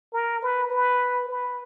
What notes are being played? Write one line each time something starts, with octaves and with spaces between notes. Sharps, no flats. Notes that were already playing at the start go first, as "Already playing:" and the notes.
A#4
B4
B4
B4